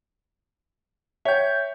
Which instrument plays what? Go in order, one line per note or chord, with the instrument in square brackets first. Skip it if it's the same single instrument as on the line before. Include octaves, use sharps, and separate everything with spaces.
[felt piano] C#5 G5 [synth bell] E5 G6